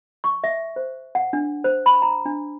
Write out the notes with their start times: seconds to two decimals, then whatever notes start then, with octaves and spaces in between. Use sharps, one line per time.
0.24 C#6
0.44 E5
0.76 C5
1.15 F#5
1.33 D4
1.64 C5
1.86 B5
2.02 A#5
2.26 D4